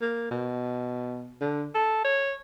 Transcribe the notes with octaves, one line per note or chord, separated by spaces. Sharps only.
A#3
B2
D3
A4
C#5